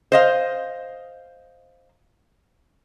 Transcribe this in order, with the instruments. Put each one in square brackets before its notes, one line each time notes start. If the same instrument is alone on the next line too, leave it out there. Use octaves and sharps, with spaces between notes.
[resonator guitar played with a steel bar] C5 D#5 F5